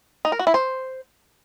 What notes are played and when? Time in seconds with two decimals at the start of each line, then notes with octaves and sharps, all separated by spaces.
0.25 D#4
0.32 A#4
0.39 F#4
0.47 E4
0.54 C5